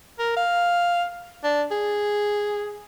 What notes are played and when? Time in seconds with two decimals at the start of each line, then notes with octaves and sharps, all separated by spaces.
0.19 A#4
0.37 F5
1.44 D4
1.71 G#4